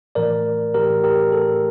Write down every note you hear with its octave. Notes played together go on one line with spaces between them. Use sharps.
A2 E3 A3 A#4 D5
A2 E3 A3 G4 A#4
G4 A#4
A2 E3 A3 A4